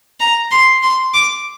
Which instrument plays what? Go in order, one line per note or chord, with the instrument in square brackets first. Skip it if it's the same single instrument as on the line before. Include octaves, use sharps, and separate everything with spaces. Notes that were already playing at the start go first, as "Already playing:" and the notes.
[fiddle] A#5
C6
C6
D6